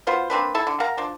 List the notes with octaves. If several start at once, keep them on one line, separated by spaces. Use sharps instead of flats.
B3 F4 F#4 C5
A#3 C4 D4 B4
E4 A4
D3
A#4 F5 F#5 A#5
F3 D4